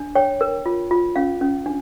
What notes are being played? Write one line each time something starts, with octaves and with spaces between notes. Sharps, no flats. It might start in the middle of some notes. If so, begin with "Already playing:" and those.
Already playing: D4
C#5 G5
A#4
F4
F4
C#4 F5
C#4
D4